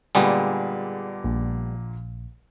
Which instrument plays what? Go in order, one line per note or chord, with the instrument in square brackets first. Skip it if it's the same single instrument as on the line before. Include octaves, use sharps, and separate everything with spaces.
[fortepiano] A#2 D3 G#3 [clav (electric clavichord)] G3 B3 [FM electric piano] G#4
[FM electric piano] A#1